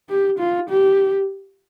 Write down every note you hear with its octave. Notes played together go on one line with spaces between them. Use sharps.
G4
F4
G4